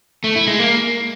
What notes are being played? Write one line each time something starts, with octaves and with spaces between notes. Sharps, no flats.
A3
E4
G#3
A#3